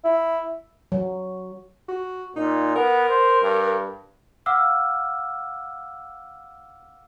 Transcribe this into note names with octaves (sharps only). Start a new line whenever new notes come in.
E4
F#3
F#4
A#2 D#4
B3 A#4
C5
G2
F5 F#5 D6 E6 F6